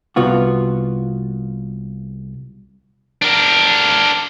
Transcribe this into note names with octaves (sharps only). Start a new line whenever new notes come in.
C2 B3 F4 F#4
D4 A#4